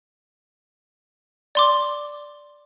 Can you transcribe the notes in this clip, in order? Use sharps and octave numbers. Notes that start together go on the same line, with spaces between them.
D5 C6 D6